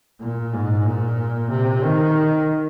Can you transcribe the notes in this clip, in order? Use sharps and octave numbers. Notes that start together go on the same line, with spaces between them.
A#2
G#2
A#2
C3
D#3